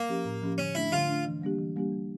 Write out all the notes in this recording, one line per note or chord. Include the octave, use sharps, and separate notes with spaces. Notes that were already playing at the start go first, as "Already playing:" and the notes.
Already playing: A#3
F3 C#4 G4
A2
F3 C#4 G4
D3 C#4
A3 D4 E4
D3 F4
A3 D4
E3
G3 A#3 D4 G4
E3
G3 A#3 D4 G4
G3